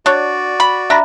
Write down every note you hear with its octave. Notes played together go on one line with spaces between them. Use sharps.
D4 F#4 C#5 D5
B5
D4 E5 A#5 B5